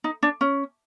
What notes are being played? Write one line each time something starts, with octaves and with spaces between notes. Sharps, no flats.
D#4
D4
C#4